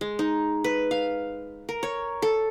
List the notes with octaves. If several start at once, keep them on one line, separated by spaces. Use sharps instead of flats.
G#3
D#4
B4
F5
A#4
C#5
A4